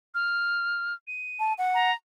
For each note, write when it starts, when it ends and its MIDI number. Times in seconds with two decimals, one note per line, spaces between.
0.15 0.94 89
1.07 1.54 99
1.39 1.53 81
1.58 1.91 78
1.74 1.93 82